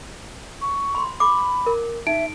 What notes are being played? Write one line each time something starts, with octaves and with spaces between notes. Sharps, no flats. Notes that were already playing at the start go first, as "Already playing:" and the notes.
C#6
B5 C6
B5 D6
A#4
D#4 E5 D7